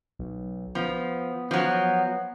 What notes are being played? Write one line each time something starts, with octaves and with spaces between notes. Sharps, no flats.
B1
F3 B3
F3 F#3